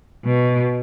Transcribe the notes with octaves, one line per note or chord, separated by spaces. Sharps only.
B2